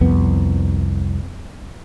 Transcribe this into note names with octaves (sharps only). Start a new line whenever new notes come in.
C2 F2 B3